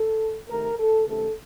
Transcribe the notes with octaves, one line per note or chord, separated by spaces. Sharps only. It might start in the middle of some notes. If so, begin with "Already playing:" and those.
Already playing: A4
C3 D#3 A3 A#4
A4
C3 D#3 A3 C#4 A4